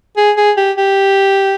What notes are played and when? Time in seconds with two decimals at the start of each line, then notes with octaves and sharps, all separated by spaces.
0.17 G#4
0.37 G#4
0.57 G4
0.77 G4